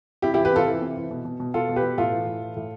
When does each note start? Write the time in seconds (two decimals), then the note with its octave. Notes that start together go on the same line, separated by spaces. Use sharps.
0.22 C3 E4 G4
0.34 E4 G4
0.38 E3
0.45 G4 B4
0.53 C3 F4 A4
0.67 E3
0.81 C3
0.97 E3
1.11 B2
1.25 B2
1.40 B2
1.54 B2 F4 A4
1.69 B2
1.76 G4 B4
1.83 B2
1.98 A2 F4 A4
2.12 E3
2.27 A2
2.41 E3
2.56 A2